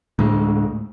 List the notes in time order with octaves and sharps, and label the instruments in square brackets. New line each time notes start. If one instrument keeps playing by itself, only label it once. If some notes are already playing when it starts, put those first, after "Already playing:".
[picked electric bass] D2 A2 G#3